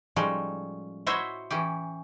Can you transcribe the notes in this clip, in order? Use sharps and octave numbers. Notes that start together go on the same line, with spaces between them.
A2 F3 G3 G#3 C#4 D#4
E4 F#4 C5 C#5 D#5 E5
E3 C#4 G4